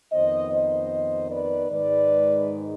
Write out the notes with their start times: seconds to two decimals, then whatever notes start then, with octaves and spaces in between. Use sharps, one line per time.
0.12 F2 D#3 B3 C5 D#5
0.52 C5 D#5
1.31 B4 D5
1.70 G#2 D#3 G#3 B4 D5